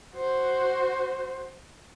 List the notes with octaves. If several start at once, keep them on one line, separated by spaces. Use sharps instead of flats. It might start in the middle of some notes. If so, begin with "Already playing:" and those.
F#4 C5